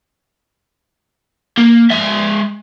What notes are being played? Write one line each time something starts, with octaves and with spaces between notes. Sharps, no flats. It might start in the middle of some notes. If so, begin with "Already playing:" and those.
A#3
G#3 E5